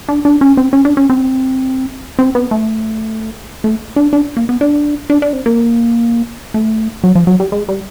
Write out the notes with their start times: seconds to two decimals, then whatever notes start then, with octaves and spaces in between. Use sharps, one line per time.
0.09 D4
0.25 D4
0.41 C#4
0.57 C4
0.73 C#4
0.85 D4
0.97 C#4
1.10 C4
2.19 C4
2.35 B3
2.51 A3
3.64 A3
3.96 D4
4.13 D4
4.37 A#3
4.49 B3
4.61 D4
5.10 D4
5.22 D4
5.33 C4
5.46 A#3
6.54 A3
7.04 F#3
7.15 F3
7.27 F#3
7.40 G3
7.52 G#3
7.69 G3